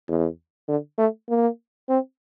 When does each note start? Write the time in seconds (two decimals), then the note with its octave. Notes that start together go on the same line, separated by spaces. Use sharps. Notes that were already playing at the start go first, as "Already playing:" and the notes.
0.08 E2
0.68 D3
0.98 A3
1.29 A#3
1.89 C4